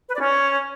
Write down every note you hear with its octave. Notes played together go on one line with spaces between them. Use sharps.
B4
D5
C#4